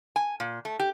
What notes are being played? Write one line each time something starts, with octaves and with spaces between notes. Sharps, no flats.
G#5
A#2
A3
G4